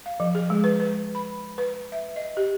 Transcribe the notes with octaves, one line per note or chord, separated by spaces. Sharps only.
F5
F3
G#4
G#3
B4
B4
B5
B4
E5
D#5
G4